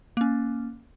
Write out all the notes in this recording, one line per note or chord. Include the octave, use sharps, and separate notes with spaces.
A#3 C#4